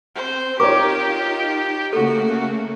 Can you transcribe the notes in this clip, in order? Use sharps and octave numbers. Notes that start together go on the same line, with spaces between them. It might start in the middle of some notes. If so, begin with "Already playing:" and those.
C4 C5
D#4 F4 G4 A#4 C#5 D6
C#3 A3 A#3 F#4 A4